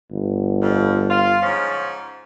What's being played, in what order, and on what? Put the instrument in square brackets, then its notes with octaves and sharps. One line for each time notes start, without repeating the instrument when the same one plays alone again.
[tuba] G1
[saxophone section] F2
F4
G#2 F3 C#4